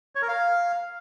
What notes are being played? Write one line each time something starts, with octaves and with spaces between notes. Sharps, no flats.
C#5
A#4
F5